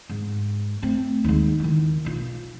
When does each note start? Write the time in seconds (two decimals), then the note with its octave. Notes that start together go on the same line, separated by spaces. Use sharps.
0.09 G#2
0.82 A3 C4
1.24 D#2 G#3
1.60 D#3 E4
2.04 B1 F4